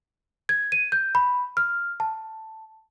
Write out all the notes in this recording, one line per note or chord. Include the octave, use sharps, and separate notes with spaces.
G#6
D#7
G6
B5
F6
A5